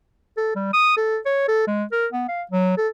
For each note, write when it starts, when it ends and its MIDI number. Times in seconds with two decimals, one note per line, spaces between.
0.37 0.52 69
0.56 0.70 55
0.73 0.97 87
0.97 1.18 69
1.26 1.44 73
1.48 1.63 69
1.68 1.84 56
1.92 2.07 70
2.13 2.24 59
2.29 2.43 77
2.51 2.77 54
2.77 2.88 69